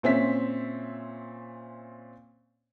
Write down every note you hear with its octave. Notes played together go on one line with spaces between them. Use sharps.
A#2 C4 C#4 E5 B6